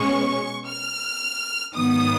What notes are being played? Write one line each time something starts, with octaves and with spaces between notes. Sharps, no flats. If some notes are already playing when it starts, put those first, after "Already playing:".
Already playing: B2 G#3 C#4 C#6
F6
G#2 D#3 F#3 B3 D#6